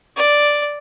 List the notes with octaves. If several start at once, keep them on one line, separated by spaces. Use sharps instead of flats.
D5